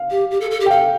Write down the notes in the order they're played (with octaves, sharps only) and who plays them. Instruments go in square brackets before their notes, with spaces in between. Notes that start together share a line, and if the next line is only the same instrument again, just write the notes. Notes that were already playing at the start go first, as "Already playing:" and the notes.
Already playing: [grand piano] F5
[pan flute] G4
G4
A4
A4
G4
[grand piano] G5
[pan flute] A4 [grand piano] F5